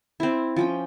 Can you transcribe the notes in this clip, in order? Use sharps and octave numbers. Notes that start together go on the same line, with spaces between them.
C4 E4
F3 C#4 G5